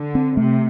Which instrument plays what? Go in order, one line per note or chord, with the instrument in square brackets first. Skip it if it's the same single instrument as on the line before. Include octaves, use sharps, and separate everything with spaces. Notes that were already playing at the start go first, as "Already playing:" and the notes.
Already playing: [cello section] D3
[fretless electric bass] C4
[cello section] C3 [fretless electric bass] A3